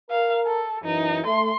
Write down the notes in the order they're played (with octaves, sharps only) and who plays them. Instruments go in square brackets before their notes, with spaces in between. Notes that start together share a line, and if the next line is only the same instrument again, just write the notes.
[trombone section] A#4 [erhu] F5
[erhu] A4
[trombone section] F#2 E3 [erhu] D#4
[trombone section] A3 [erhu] C6